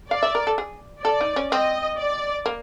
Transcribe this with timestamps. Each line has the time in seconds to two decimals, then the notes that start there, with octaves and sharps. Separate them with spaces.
0.11 D5 F5
0.23 E5
0.35 A#4
0.47 A4
0.58 G#4
1.04 A4 D5
1.21 D#4
1.36 C#4
1.52 C4 D#5
1.98 D5
2.46 A#3